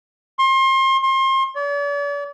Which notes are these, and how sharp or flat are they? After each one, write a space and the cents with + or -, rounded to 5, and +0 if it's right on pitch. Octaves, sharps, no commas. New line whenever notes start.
C6 +35
C6 +35
D5 -45